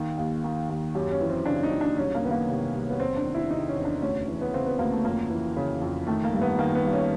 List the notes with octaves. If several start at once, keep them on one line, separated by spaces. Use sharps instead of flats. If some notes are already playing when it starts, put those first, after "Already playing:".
Already playing: D#2 D#3
D#2
D#3
D#2
F#2 G4
C#4
E3
C4
C#3 D4
D#4
F#2
D4
C2 C#4
A#3
D#3 B3
A#3
C3
C2
B3
E2 C4
D4
D#3
E4
C3 D#4
C#4
E2
D4
D2 C#4
E3
B3
C#3 C4
B3
D2 A#3
A3
F2 A#3
E3
C#3
F2
D#3 A3
A#3
G2
B3
D#3 A#3
B3
G2
C#4